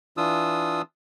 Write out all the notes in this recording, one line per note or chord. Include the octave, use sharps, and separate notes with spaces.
E3 D4 F4 D#6 E6